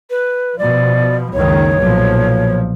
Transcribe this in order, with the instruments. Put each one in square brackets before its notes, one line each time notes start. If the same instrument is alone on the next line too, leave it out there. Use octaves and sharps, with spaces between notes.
[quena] B4
[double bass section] B2 F3 [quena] D5
[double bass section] F#1 C#2 D#3 [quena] C#5
[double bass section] B1 A#2 F3